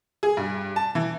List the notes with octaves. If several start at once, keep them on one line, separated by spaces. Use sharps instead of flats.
G#4
G2
A5
E3